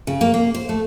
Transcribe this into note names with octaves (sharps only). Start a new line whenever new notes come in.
C#3
A#3
A#3
C5
A3